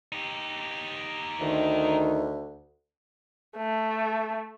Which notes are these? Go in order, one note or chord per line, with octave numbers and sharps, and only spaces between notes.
D#4 G4
D2 D#3
A3